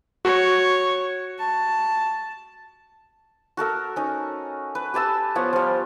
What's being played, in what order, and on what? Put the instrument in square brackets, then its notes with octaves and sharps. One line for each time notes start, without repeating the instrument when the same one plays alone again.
[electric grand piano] F#4 [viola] C#5
[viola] A5
[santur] F#4 A4 A#4 E6
C#4 D#4
B4
G4 B4 A5 E6
F3 B3 C#5 F#5
F3 G3